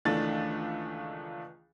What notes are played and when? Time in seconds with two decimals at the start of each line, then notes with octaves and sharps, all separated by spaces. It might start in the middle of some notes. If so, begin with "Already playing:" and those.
0.05 C#2 D#3 E3 A3 D4 A6